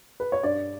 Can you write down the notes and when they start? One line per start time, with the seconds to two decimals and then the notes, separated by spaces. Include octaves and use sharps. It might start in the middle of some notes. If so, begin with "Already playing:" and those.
0.20 B4
0.32 C#5
0.43 G2 D5